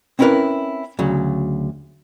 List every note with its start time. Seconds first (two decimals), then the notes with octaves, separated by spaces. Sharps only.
0.19 C4 C#4 E4 G#4 A#4 B4
0.99 D2 C#3 F#3